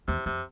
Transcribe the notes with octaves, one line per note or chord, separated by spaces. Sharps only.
E2 C3
F2 C3